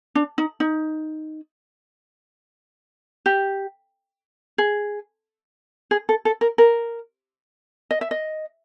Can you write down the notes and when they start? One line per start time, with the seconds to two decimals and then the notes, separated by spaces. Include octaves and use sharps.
0.15 D4
0.38 D#4
0.60 D#4
3.26 G4
4.58 G#4
5.91 G#4
6.09 A4
6.25 A4
6.41 A#4
6.58 A#4
7.91 D#5
8.01 E5
8.11 D#5